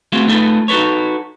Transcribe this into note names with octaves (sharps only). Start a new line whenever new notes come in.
A3 B3 C4 F4 F#4 G#4
A3 D#4 F4 G#4 A4 B4
D#4 F#4 A4 B4 C#5